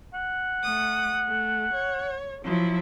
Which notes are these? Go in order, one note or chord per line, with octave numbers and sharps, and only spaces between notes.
F#5
A3 D#6
A3
C#5
F3 F#3 E4